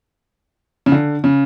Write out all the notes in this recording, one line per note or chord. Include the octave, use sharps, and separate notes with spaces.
C#3
D3
C#3